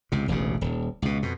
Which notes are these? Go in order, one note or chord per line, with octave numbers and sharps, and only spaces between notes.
C#2 C3
E1 A1 D2 C#3
D#1
C#2 B2
F2 B2